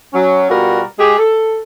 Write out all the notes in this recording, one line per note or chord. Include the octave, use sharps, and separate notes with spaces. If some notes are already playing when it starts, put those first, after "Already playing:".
F#3 C#4
B2 G3 F4 F#4 A#4
G#3 G4 G#4
A4